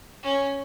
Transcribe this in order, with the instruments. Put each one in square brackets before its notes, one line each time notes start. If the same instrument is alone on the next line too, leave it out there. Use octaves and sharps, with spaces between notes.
[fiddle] C#4